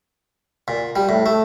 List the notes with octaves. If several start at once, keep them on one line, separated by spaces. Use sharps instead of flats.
A#2
G3
A2
A3